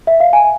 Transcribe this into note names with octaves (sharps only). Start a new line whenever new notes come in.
E5
F5
G#5